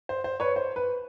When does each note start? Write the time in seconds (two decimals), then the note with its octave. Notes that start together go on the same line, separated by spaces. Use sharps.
0.09 C5
0.24 C5
0.40 B4 C#5
0.56 C5
0.76 B4